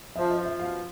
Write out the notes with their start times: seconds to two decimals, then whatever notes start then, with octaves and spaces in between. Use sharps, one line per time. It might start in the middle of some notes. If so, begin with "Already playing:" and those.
0.16 F3 E5
0.30 D#5
0.37 F3
0.45 E5
0.59 B2 F5